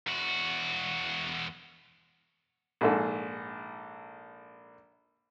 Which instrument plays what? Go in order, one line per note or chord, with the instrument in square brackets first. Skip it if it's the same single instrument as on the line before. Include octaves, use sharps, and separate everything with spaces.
[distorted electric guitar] E2 F#4
[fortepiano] A#1 G#2 A4